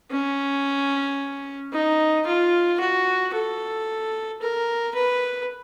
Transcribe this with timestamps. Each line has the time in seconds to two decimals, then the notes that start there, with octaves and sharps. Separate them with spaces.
0.11 C#4
1.72 D#4
2.26 F4
2.80 F#4
3.34 A4
4.42 A#4
4.95 B4